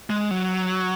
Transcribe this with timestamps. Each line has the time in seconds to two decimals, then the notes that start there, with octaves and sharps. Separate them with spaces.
0.10 G#3
0.31 F#3